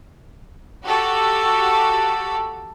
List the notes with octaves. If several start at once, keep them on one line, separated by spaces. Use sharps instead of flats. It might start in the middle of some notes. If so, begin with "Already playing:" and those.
F#4 G4 A4